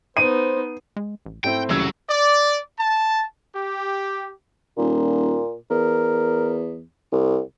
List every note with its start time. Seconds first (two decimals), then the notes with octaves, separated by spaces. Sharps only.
0.17 B3 D#4 C5 D#7
0.96 G#3
1.26 A1
1.44 G#2 A3 C4 E4 G5
1.70 F1 C#2 D#3 F#3 E4 E6 G#6
2.10 D5
2.79 A5
3.56 G4
4.77 D#1 A#2
5.70 E2 A#4
7.12 C2